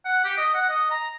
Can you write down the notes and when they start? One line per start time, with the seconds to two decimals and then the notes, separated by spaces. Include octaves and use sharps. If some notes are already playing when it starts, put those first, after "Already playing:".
0.05 F#5
0.24 G4
0.37 D#5
0.54 F#5
0.69 D#5
0.90 A#5